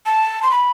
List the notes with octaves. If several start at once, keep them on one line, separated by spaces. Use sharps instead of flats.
A5
C6
B5